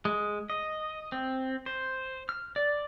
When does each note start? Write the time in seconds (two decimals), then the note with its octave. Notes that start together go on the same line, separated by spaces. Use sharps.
0.05 G#3
0.50 D#5
1.12 C4
1.66 C5
2.29 F6
2.56 D5